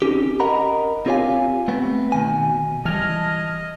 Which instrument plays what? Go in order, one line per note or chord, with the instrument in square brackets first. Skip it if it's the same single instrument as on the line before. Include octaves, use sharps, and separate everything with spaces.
[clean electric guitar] C4 C#4 D#4 G4
A#4 D#5 F#5 A#5 B5
C4 F4 G4 C#5 F5 G#5
A3 B3 C4
B2 D#3 G#5
[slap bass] E3 G3 [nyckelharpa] D#5 [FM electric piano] A5 F6 G#6